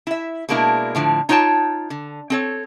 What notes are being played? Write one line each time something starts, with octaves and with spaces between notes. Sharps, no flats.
E4 E5
B2 G#3 A#3 D4 E4
A2 D3 F3
D#4 F4 C#5 G5 A5
D3
C4 A4 C#5